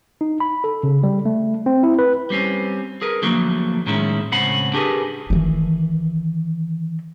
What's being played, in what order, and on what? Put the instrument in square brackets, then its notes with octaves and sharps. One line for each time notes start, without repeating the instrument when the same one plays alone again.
[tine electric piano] D#4
B5
A4
C#3
G3
A3
C4
E4
B4
[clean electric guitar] G3 C4 C#4
G#4 A#4 B4
D3 F3 F#3 A3 A#3
A2 D#3 G#3 C#4 E4
C#2 A2 C4 C#4 F#5 B5
D4 G4 G#4 A#4 B4
[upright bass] D#3 E3